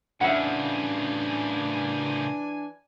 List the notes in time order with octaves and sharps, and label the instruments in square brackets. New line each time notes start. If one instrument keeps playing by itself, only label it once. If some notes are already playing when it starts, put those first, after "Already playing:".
[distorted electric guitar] A2 C#3 [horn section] E3 D4 G#5 [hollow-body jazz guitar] E5 F#5